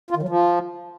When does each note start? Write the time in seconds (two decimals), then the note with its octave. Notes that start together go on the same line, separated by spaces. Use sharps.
0.10 F4
0.16 D#3
0.22 F#3
0.28 F3